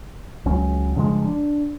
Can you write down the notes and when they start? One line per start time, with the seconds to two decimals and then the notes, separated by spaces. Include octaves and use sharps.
0.46 C#2 F#3 C#4
0.96 G2 C#3 F3 G#3
1.25 D4